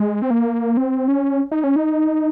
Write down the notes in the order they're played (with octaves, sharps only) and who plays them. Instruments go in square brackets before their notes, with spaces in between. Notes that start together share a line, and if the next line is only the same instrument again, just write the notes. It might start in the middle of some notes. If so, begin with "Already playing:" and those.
Already playing: [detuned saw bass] G#3
C4
A#3
C4
C#4
D#4
C#4
D#4